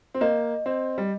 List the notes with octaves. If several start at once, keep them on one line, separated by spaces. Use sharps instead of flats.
C4
A#3 D#5
C4 D#5
G3